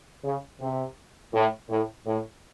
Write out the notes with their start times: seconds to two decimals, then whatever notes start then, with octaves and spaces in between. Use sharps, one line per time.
0.24 C#3
0.61 C3
1.34 A2
1.70 A2
2.07 A2